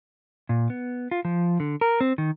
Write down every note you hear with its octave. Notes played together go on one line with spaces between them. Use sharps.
A#2
B3
F4
F3
D3
A#4
C4
D#3